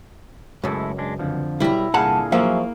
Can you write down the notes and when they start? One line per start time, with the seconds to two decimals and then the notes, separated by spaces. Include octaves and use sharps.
0.64 C#2 F#2 G#3 A3 E4
0.98 G#3 D4
1.19 F2 D3 F3
1.60 B1 G3 E4 A#5
1.94 C2 A#2 D3 G#4 F5 F#5 A5
2.32 F3 F#3 A#3 G#4 E5